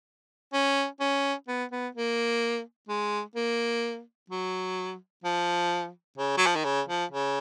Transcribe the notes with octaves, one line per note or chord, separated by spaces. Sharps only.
C#4
C#4
B3
B3
A#3
G#3
A#3
F#3
F3
C#3
F#3
F3
D#3
C#3
F3
C#3